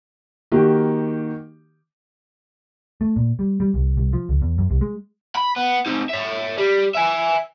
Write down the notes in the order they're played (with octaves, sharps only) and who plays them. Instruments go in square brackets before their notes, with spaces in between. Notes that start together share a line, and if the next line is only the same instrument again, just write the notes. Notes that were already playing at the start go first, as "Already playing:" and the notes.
[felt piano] D#3 A#3 F#4 G4
[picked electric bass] A3
A#2
G3
G3
C2
C2
F3
C#2
E2
F#2
C2
G#3
[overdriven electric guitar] B5
B3
C4 D#4
C#5 E5
G3
E5 G#5